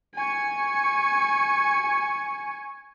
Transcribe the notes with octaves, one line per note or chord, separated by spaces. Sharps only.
G#5 C#6